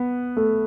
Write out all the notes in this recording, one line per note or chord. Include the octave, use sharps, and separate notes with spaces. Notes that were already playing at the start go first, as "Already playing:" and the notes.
Already playing: B3
A3